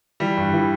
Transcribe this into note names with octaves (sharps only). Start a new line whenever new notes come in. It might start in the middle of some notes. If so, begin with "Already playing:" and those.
E3 G3
G2
E3